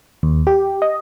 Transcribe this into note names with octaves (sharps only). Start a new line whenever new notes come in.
D#2
G4
D#5